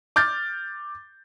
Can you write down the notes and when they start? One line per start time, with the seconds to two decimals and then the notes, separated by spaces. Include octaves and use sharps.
0.16 D6 F6 G6 A6